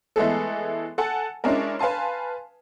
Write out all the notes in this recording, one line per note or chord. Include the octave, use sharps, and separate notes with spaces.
E3 G#3 A3 B3 G#4 A4
A4 F#5 G#5 A5
G#3 C#4 D4 E4 A#4
B4 F5 G#5 A5 C6